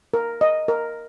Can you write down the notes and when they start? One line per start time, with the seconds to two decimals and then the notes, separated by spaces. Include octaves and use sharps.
0.14 A#4
0.41 D#5
0.68 A#4